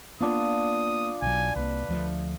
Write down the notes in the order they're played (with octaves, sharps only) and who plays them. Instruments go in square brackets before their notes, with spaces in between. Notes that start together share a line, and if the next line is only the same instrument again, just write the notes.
[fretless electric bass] A#3 B3 [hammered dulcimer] D4 F4 [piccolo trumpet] D#6
[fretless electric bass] B1 F#3 [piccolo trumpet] G#5
[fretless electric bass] C2 A#3 [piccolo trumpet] B4
[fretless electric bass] D2 F3 A3